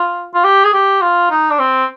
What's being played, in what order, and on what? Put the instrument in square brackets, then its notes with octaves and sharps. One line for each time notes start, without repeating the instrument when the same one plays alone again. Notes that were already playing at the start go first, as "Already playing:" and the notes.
Already playing: [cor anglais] F4
F4
G4
G#4
G4
F4
D#4
D4
C4